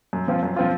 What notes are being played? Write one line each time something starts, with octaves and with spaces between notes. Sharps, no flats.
F#2
F3 C4 F4
F#2
F3 C4 F4